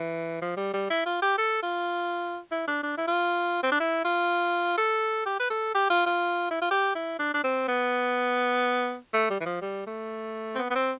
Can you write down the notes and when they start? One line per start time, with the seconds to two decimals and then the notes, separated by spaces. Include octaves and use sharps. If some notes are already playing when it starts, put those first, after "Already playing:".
Already playing: E3
0.42 F3
0.57 G3
0.73 G3
0.90 E4
1.06 F4
1.22 G4
1.38 A4
1.62 F4
2.52 E4
2.67 D4
2.83 D4
2.97 E4
3.08 F4
3.63 C4
3.72 D4
3.80 E4
4.04 F4
4.78 A4
5.26 G4
5.40 B4
5.50 A4
5.75 G4
5.90 F4
6.06 F4
6.50 E4
6.62 F4
6.71 G4
6.95 E4
7.19 D4
7.34 D4
7.44 C4
7.68 B3
9.14 A3
9.30 G3
9.40 E3
9.46 F3
9.62 G3
9.87 A3
10.55 C4
10.59 B3
10.70 B3
10.75 C4